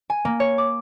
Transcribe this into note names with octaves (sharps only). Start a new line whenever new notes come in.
G#5
A#3
C#5
D6